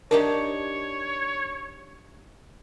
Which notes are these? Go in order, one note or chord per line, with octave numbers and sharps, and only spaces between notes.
D4 D#4 G4 A#4 C#5